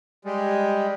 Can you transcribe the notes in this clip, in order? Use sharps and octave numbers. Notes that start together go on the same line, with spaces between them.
G3 G#3